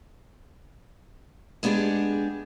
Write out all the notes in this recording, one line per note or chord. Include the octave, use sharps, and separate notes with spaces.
G#3 B3 D4 G4 G#4